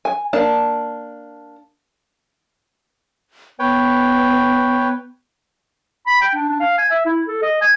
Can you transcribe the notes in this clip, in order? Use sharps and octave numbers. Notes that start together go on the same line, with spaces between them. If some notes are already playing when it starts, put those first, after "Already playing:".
G#5
A#3 D4 A5
B3 B4 C#5 G5
B5
G5
D4
D4
F5
G#5
E5
E4
A4
D#5
G#5